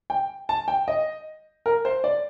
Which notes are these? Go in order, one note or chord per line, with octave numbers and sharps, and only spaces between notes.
G5
A5
G5
D#5
A#4
C5
D5